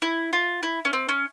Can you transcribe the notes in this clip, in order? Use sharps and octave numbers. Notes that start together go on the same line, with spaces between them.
E4
F4
E4
C#4
C4
C#4